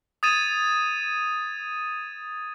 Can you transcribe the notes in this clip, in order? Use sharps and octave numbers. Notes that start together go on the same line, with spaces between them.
D#6 G#6 A6 D#7 E7